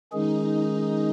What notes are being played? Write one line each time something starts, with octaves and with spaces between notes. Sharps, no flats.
D#3 G#3 C#4 D#4 G#4